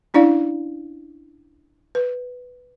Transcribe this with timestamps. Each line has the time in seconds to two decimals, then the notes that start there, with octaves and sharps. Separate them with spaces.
0.14 C#4 D4 E4 D5 F5
1.95 B4